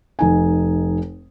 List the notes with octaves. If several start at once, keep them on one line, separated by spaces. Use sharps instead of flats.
F1 D#4 G#5